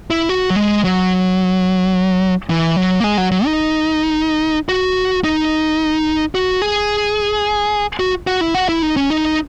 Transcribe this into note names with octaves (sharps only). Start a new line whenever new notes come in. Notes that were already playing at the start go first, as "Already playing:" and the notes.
E4
F#4
F#3
G#3
F#3
E3
F#3
A#3
G#3
F#3
F#3
D#4
F#4
D#4
F#4
G#4
F#4
F#4
E4
F#4
E4
D#4
C#4
D#4